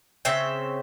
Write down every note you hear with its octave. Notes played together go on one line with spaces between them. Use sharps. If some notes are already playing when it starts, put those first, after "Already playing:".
C#3 C4 E5 G5